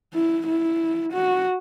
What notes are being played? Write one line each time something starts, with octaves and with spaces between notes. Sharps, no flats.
E4
E4
F#4